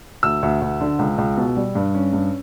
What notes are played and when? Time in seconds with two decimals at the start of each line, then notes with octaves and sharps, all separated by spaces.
0.23 D2 E6
0.43 D2
0.62 D2
0.81 D3
0.99 C#2
1.18 C#2
1.37 B2
1.57 G3
1.75 G2
1.95 C#4
2.13 G2